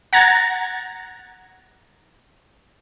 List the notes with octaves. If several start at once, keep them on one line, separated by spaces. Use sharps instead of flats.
F#5 A#5 G#6 A6